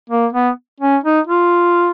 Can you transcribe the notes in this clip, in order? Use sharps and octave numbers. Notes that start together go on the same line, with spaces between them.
A#3
B3
C#4
D#4
F4